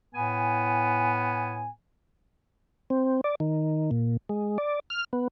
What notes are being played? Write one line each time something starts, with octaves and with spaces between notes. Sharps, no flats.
A2 B3 G#5
C4
D5
D#3
A#2
G#3
D5
F6
B3